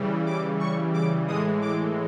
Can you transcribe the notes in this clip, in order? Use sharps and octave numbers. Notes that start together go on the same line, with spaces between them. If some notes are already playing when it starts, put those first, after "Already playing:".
Already playing: C#3 E3 G3
D6
C#6
D6
A2 E3 G#3 D#6
D6